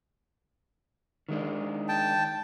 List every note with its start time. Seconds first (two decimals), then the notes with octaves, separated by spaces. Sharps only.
1.29 D#3 G#3 D4
1.88 G5 A5